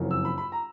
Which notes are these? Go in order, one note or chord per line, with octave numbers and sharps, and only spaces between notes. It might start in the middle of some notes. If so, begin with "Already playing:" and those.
Already playing: F#1 F2 C#3 F#3 A#3
E6
B5
B5
A#5